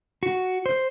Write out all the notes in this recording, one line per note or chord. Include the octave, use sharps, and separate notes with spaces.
F#4
C5